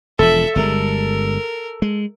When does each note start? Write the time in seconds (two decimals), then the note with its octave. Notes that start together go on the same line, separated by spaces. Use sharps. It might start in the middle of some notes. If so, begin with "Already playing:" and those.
0.19 E1 F3 A4 E5
0.56 G1 G3 G#3 A#4
1.82 G#3